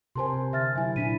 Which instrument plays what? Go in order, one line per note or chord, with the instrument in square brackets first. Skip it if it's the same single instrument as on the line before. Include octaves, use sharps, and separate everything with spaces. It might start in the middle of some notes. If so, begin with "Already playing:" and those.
[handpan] C3 A#4 C5 [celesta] G#5 A5 C6
[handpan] D3 [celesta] E5 F6 A6
[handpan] F#3 E4 [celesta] E5 G#5
[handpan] A#2 D4 E4 [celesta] B6 D#7